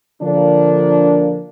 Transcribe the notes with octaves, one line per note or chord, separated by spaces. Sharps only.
D3 F3 A#3 D4